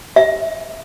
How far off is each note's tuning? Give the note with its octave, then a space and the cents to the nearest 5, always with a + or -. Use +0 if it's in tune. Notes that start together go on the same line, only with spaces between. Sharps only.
E5 -5